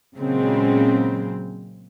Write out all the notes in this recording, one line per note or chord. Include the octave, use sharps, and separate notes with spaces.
A#2 C#3 F#3 G#3 C4